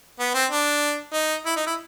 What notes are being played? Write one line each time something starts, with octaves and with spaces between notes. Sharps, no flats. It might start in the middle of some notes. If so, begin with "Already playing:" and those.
B3
C4
D4
D#4
E4
D#4
E4